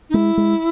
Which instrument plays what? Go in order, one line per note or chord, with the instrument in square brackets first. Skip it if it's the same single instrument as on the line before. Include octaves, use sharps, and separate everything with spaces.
[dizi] D#4
[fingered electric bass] G#3 [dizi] E4
[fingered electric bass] G#3